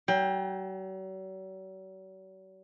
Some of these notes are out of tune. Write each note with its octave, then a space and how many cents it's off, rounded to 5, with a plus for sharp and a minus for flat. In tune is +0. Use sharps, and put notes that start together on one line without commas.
F#3 +45 G5 +25